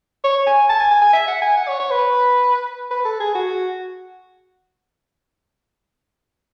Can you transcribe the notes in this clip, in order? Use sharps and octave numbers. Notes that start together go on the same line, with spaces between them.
C#5
G#5
A5
G#5
G#5
G#5
E5
F#5
G#5
F#5
C#5
C#5
B4
B4
A4
G#4
F#4